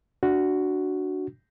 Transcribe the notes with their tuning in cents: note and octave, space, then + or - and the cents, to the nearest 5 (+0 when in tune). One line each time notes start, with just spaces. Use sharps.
D4 +0 F#4 +0